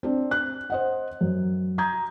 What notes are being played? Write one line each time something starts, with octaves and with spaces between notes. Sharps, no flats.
C4 D4
F#6
C5 D#5 F#5
F#2
A#5 D#6 G6 G#6